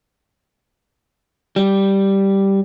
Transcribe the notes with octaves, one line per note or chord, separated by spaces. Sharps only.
G3